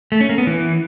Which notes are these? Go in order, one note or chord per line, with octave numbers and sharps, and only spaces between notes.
A3
C#4
A#3
B3
E3